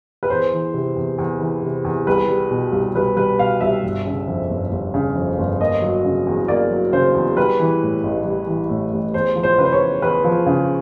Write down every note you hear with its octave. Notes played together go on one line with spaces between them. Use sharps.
B4
E2 C5
E3
C3
E2
E2
E3
C3
E2
C2 B4
G3
B2
C2
C2 B4
G3 B4
B2 F5
C2 E5
G1
C#3
F2
G1
G1
C#3
F2
G1
A#3 D#5
F#3
C#3
E2
A#3 D5
F#3
C#3 C5
E2
G3 B4
E3
A2
A1
G3
E3
A2
A1
E2 C5
F3
C5
C#3 B4
C5
C#5
E2
E2 B4
F3
C#3